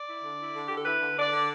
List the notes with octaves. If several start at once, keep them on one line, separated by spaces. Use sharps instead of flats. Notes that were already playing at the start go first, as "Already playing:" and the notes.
Already playing: D5
E4
D3
E4
D3
D3 G4
A4
E4 B4
D3
D3 D5
D3